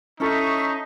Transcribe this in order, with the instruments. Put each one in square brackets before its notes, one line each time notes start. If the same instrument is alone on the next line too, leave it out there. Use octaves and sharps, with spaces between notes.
[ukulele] C#4 E4 A4 [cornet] D#4 [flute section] E5 C#6